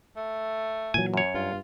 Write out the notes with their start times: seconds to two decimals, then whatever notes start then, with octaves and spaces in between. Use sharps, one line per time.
0.16 A3
0.94 A#2 E3 F#3 G#5
1.14 F#2 C#5
1.34 G2 F4